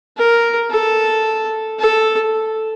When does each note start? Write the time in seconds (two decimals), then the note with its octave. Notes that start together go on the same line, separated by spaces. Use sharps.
0.17 A#4
0.71 A4
1.79 A4